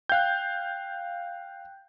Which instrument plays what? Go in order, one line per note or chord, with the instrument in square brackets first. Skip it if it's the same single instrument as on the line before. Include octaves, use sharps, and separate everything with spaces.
[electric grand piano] F5 G6 [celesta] G5 F#6